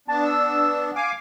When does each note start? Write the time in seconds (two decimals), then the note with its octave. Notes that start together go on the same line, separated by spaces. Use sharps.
0.08 B3 D4 A5
0.24 E6
0.95 F5 G#5 D6